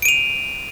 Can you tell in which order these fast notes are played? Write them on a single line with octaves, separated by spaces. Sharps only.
D7 D#7 F7